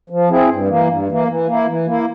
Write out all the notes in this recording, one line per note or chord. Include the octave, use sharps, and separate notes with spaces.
F3
C4 E4 G#4
G2
E3 A#3
G2
E3 A#3
E3
A#3 E4
E3
A#3 E4